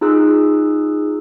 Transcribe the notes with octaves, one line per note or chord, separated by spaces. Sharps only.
D#4 F4 G#4 E6 F#6